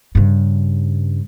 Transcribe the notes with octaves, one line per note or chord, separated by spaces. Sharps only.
G2 C#3